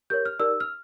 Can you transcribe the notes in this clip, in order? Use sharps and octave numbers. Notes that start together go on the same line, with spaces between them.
G4 A#4 C#5 G6
F6
D#4 G4 A#4 D5 E6
F6